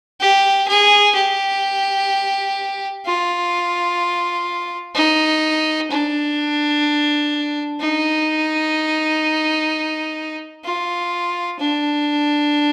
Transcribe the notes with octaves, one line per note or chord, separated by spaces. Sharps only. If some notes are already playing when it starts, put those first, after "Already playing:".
G4
G#4
G4
F4
D#4
D4
D#4
F4
D4